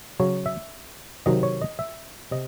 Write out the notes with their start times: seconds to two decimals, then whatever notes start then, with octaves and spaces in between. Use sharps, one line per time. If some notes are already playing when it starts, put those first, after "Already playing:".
0.20 C#3 F#3 C#5
0.46 E5
1.26 C3 D#3 F#3 D#5
1.43 C#5
1.62 D#5
1.79 E5
2.31 C3 D#5